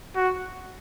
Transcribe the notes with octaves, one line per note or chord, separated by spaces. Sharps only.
F#4